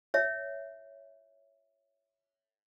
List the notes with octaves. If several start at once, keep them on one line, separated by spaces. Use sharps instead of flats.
C#5 E5